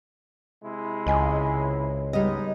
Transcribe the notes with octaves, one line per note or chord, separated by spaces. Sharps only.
C3 G#3 E4
C#2 D#5 G#5
G3 G#3 B3 D#4 D#5